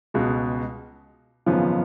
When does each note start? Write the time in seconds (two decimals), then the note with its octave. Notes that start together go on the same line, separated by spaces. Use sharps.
0.14 C#2 B2 G#3
1.46 G#1 F#2 C#3 F3 B3